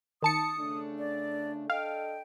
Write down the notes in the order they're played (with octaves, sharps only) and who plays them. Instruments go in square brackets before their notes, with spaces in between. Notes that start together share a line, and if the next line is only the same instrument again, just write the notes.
[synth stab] D#3 A5 C#7 [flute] D#6
[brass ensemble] C#3 A3 D4
[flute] D5
[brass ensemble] D4 A4 D#5 [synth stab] F5 [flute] G5